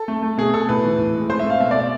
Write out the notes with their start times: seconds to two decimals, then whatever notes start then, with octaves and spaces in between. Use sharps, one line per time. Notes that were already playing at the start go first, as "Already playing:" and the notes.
Already playing: A4
0.08 A3
0.22 A3
0.37 B2 G#4
0.54 B2 A4
0.69 A2 B4
0.84 E3
0.98 A2
1.14 G#3
1.30 A3 C5
1.39 E5
1.45 A3 F5
1.60 B2 E5
1.71 D5
1.75 B2 E5